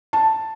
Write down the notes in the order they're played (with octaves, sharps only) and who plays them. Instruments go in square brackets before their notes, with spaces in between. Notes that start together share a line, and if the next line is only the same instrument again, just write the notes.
[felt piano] A5